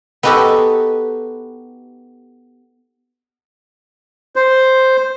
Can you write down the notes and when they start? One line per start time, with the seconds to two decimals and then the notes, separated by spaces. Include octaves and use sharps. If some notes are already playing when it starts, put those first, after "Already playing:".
0.23 B3 D#4 F#4 G4 A4 B4
4.36 C5